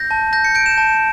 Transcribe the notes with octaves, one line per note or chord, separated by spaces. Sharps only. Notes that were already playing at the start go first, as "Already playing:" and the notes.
Already playing: G6 A#6
A5
G6 A#6
C#7
G6 D7
E7
A5